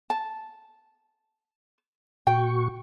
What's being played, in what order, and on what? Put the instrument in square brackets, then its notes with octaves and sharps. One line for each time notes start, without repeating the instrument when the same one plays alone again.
[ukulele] A5
[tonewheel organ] A#2 F#4 C#6 [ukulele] G5